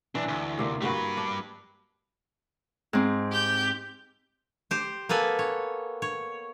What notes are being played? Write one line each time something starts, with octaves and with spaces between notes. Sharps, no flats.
B1 E3 D4
D2
C3 A#3
G2 G3 A#3 F#4 B4
D4
G#2 C4
G4 G6
G4 C5
A#3 B3 A4 B4 G#5
C#5
C#5